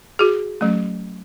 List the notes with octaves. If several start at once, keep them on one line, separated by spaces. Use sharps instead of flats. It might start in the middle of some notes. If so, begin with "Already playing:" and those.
F#4 G#4
F#3 A3 C#4